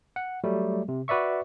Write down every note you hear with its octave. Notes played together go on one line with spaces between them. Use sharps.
F#5
F#3 G3 A3
C3
F#4 B4 D5 E5 C#6